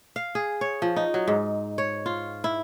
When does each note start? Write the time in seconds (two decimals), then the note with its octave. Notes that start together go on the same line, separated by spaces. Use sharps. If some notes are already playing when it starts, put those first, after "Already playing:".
0.16 F5
0.35 G#4
0.61 C#5
0.82 F3
0.96 D#4
1.14 F#3
1.28 G#2
1.78 C#5
2.06 F4
2.44 E4